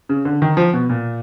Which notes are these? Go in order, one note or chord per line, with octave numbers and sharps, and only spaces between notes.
C#3
D3
D#3
F3
B2
A#2